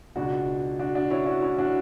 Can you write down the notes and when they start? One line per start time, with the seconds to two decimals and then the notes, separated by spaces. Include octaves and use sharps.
0.16 C#2 B2 D4 F#4
0.79 D4 F#4
0.95 D4 F#4
1.10 C#4 E4
1.26 D4 F#4
1.42 C#4 E4
1.58 D4 F#4